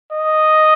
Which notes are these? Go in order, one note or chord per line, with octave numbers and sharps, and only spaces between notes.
D#5